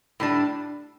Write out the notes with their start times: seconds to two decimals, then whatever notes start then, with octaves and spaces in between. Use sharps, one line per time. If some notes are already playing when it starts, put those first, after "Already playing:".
0.20 A2 G3 D4